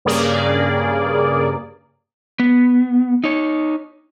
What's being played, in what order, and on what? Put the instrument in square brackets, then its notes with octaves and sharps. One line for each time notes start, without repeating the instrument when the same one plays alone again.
[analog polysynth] G2 C#3 A#3 G#4 D5
[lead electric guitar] B3
D#4 C#5